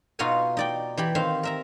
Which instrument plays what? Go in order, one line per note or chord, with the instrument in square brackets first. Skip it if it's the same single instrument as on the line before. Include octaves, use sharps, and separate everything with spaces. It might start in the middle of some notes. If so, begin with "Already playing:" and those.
[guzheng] B2 D#4 F4 F#4 F5 G#5
D#4 D5 G5
E3 G4 B5
D#3 C4 F5
A#4 E5 A#5